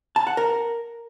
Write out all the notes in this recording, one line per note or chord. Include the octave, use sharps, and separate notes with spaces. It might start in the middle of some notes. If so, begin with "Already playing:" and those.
A5
F#5
A#4